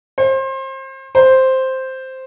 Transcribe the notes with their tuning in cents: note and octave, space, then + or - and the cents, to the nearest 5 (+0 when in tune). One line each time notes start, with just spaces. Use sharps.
C5 +30
C5 +0